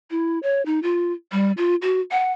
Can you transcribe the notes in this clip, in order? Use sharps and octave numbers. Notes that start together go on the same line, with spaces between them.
E4
C#5
D#4
F4
G3
F4
F#4
F#5